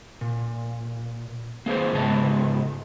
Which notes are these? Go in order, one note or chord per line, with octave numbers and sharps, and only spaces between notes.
A#2
A#3 G#4 B4 C5
G#2 C#3 G#3 B3 A5 A#5